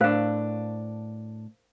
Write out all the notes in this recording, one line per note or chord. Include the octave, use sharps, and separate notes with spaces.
A2 D4 A#4 C5 F5